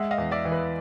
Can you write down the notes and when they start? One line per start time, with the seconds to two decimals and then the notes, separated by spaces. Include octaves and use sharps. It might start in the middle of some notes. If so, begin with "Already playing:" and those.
Already playing: G#3 E5 F#5
0.11 D#5 F5
0.18 E2
0.31 D5 E5
0.45 E3
0.52 B4